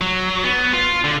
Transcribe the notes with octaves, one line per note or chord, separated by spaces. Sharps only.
F#3
B3
F4
D3